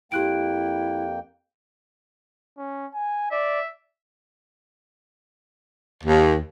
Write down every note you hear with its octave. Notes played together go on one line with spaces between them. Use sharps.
F2 A#3 E4 G4 G5 F#6 D7
C#4
G#5
D5 E5
D#2